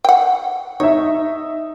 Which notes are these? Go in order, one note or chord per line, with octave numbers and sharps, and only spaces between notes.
F#5 G5
D#4 C#5 E5